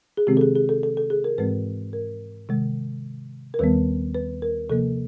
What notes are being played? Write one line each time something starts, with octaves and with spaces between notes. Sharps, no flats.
G#4
C3 D#3 G#3 C4 G4
A4
G#4
G#4
A4
A4
A4
G#4
A#4
G#2 E3 G#3 C4 B4
A#4
C3 D#3 G#3
A#4
D#2 D#3 G3 B3 B4
B4
A#4
C3 F3 A#3 A4